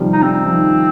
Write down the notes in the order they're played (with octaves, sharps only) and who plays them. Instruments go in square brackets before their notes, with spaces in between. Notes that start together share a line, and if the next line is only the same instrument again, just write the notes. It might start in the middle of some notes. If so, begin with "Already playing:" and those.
Already playing: [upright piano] C3 D#3 F3 G3
[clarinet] D#4
[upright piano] G3 [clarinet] C4
[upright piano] F3
D#3